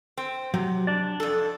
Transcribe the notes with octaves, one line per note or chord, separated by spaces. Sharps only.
C4
C3 F#3
D4 D5
F2 A4